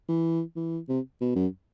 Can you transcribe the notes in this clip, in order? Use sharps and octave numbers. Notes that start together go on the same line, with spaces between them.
E3
E3
C3
B2
F#2